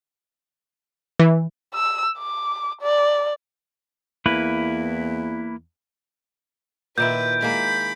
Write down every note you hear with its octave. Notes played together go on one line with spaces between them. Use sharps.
E3
E6
D6
D5
E2 A#3 E4 B4
A#2 D#3 E4 B4 G6 D7
G#3 A#3 B5